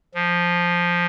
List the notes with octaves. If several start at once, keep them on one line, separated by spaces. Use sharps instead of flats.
F3